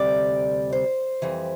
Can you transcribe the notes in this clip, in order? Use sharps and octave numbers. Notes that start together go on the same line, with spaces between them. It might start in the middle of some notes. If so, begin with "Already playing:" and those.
Already playing: D2 C3 G3 D5
C5
F2 E3 G3